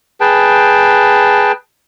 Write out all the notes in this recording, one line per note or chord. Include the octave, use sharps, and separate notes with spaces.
G#4 B4 G5 A5